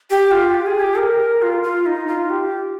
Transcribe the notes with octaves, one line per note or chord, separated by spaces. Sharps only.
G4
F4
G4
G#4
G4
A#4
F4
F4
D#4
F4
G4